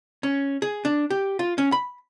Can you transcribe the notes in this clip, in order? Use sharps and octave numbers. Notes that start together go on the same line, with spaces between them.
C#4
G#4
D4
G4
F4
C#4
B5